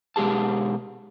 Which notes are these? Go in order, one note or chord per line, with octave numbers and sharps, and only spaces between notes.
B2 G#3 G4 G#4 A5